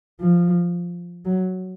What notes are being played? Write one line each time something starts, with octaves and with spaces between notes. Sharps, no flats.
F3
F#3